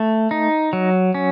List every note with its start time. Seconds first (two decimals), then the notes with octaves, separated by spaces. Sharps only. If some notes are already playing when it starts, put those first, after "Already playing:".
Already playing: A3
0.31 D#4
0.73 F#3
1.15 C#4